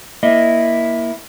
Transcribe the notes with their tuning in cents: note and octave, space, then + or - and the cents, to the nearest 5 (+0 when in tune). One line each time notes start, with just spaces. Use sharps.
A#3 +20 E4 +0 D#5 -5